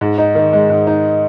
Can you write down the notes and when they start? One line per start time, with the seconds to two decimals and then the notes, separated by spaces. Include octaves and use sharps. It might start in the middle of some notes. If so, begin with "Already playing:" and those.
0.01 G#2
0.18 D#4
0.35 D#3
0.53 G#3
0.70 G#2
0.87 D#4